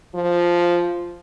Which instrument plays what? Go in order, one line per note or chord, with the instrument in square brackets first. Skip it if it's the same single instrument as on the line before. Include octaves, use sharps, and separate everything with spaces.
[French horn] F3